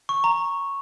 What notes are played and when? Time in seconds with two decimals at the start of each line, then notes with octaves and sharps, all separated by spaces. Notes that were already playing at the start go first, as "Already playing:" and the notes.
0.09 C#6
0.24 A#5